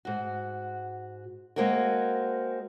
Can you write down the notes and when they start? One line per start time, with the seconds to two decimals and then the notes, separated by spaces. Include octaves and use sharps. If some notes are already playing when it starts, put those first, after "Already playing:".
0.05 G#2 F#4
1.56 G#3 A#3 C4 F#4 A#4